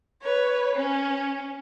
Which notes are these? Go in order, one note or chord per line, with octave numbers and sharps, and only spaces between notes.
B4 C#5
C#4